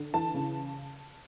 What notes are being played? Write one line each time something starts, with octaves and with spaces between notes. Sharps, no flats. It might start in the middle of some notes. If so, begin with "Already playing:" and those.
Already playing: D3
E3 A5
C#3